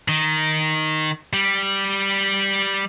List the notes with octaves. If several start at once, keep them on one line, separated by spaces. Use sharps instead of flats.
D#3
G3